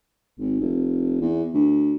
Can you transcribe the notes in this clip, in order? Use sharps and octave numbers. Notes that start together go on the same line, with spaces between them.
G#1
F1
E2
D2